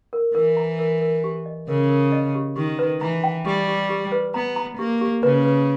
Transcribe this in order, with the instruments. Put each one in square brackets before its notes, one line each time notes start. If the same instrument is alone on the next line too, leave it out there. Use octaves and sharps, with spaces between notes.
[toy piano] A#4
[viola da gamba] E3 [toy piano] A#4
[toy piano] A#5
A#4
A#4
G4
D#5
[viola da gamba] C#3 [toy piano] A#4
[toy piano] A#4
D#5
G4
[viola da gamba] D#3 [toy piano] G4
[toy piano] B4
[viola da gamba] E3 [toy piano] A#5
[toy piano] G5
[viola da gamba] G3 [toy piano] G4
[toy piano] G4
G4
B4
[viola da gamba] B3 [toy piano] A#5
[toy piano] A#5
[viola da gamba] A#3 [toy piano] G4
[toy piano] G4
[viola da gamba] C#3 [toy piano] B4
[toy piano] B4